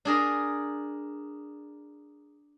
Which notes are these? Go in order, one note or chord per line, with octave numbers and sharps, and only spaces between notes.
D4 G#4 A#4